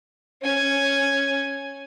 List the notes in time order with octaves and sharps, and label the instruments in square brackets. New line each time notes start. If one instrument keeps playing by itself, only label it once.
[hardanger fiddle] C#4 G#5